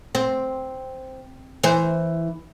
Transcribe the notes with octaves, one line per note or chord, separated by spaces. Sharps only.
C4
E3 C5